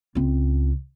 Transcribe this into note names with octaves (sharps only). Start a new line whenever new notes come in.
C#2 C4